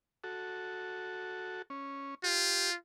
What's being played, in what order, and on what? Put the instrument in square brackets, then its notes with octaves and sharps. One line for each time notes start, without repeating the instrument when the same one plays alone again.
[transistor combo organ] F#4 A4
C#4
[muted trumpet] F4 [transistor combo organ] G4